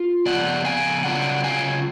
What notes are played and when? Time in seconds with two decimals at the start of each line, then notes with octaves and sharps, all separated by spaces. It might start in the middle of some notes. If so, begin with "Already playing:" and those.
Already playing: F4
0.26 C#3 F3 B3 D5 F#5
0.65 F5 G#5
1.04 C#3 F#3 C#4 F4 D5 F#5
1.44 F5 G#5